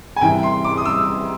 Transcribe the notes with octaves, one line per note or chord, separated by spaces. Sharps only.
G#5
C2 C3 E3 G5
C6
D6
D#6
E6